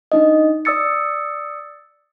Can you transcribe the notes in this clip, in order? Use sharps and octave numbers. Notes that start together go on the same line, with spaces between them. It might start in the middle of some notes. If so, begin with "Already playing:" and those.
D4 D#4 D#5
D5 D#6 E6 A6 C#7